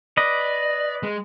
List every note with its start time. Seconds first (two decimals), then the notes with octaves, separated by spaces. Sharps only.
0.17 B4 D5 D#5
1.03 G#3